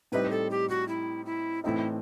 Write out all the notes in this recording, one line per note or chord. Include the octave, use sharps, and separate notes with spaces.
A2 G3 C4 D#4 B4
A4
G4
F#4
E4
E4
A2 E3 A3 C4 D#4 E4